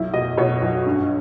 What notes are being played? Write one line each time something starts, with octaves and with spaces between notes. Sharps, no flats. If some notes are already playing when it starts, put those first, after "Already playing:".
Already playing: B1 E4
B2 D#5
B2 C#5
B1
G2